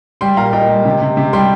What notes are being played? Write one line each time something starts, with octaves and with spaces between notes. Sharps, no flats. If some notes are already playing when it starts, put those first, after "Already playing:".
G3 G5 C6
A#2 F5 A#5
A#2 D#5 G5
G3
C3
C3
C3
G3 G5 C6